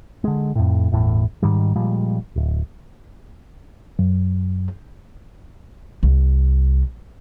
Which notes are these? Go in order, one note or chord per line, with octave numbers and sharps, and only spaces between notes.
D3 G#3
F2 A2
G1 E2 A2
G#2 D#3 G3
A#2 F3 G3 G#3
D1
F#2
C2